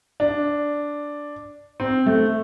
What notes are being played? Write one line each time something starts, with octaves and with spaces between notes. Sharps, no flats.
D4
C4
A3